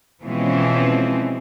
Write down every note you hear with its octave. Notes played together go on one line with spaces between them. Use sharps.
B2 E3 F3 G#3 C4 C#4